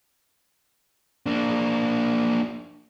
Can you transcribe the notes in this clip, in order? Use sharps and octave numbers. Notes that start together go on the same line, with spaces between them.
A#3 D4